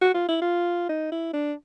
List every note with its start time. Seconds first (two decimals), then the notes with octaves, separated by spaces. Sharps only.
0.01 F#4
0.14 F4
0.28 E4
0.42 F4
0.89 D#4
1.12 E4
1.33 D4